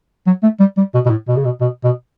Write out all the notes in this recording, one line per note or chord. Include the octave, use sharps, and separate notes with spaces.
F#3
A3
G3
G3
B2
B2
A2
B2
C#3
B2
B2
B2